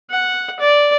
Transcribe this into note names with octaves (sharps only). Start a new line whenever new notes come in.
F#5
D5